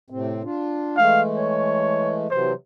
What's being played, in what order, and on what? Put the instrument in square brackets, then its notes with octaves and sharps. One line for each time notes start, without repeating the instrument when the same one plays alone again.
[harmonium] A2 C3 C4
D4 F4
[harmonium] E3 G#3 A3 [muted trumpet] F5
[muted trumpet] C#5
[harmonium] C3 E3 F#3 [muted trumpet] C5